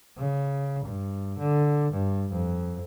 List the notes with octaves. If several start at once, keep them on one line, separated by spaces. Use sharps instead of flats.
C#3
G2
D3
G2
F2